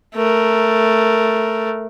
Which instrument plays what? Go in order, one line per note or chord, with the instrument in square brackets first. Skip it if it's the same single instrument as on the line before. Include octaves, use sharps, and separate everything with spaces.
[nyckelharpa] A3 A#4